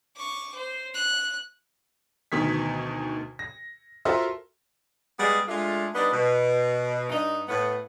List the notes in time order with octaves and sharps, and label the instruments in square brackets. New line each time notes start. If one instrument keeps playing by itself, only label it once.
[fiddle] C#6 D6
C5
F#6
[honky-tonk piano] D2 B2 D#3 G#6 B6
A#6
F4 F#4 A4 A#4 C5 E5
[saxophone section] G3 G#3 B3 G#4
G#3 A3 D4 F4
G3 B3 D4 D#4 D#5
B2
G2 D#4
A2 B3